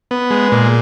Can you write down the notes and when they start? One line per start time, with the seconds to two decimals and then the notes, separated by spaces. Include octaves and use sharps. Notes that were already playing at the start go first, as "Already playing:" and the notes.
0.11 B3
0.31 G#3
0.52 A#2